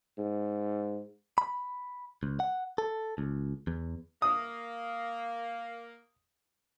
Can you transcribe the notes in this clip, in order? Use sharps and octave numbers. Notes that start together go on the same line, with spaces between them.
G#2
B5
C#2
F#5
A4
C#2
E2
A#3 D#6